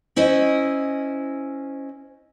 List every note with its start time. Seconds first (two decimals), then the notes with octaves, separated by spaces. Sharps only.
0.16 C#4 E4 C5 D#5